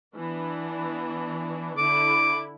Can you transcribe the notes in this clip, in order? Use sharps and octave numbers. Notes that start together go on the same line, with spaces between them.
E3 B3 D4
D3 E4 D6